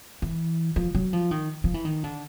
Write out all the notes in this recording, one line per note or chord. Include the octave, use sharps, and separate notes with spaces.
E3
F3
F#3
F3
D#3
F3
E3
D#3
D3